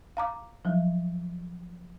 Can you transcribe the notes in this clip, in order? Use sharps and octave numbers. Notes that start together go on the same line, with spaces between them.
F5 A#5 D6
F3 F#3